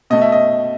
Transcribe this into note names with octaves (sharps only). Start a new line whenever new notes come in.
B2 A3 D#5
E5
D#5